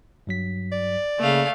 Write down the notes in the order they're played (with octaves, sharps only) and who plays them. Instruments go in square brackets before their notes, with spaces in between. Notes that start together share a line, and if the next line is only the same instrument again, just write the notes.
[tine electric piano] G2 F#3 B6
[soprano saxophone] D5
[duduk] C#3 [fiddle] A3 F5 [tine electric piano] A#3